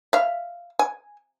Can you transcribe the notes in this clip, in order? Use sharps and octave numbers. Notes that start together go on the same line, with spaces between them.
E5 F5
G#5